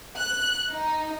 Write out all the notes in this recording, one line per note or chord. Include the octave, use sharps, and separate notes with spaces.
F#6
D#4